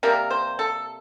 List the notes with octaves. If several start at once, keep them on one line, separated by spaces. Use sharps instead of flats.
C3 G3 A#3 A#4
C5
A4